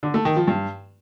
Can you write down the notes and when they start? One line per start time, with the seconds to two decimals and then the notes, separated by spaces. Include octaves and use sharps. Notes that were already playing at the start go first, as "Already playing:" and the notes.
0.03 D3
0.14 A3
0.25 D#3
0.36 F3
0.48 G2